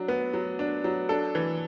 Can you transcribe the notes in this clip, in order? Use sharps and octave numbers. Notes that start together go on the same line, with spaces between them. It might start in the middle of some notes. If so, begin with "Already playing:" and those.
Already playing: F#3 D4
B3
F#3
D4
F#3
D4 A4
E3